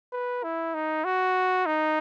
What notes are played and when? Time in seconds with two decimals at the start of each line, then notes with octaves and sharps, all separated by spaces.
0.12 B4
0.43 E4
0.74 D#4
1.04 F#4
1.66 D#4